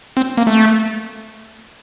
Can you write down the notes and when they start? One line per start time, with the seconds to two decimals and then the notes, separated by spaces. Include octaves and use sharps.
0.17 C4
0.37 A#3
0.47 A3